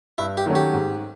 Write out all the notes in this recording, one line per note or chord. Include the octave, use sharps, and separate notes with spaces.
G2 E4
G4
D#3 F#3 A3 C#4
G4
G#2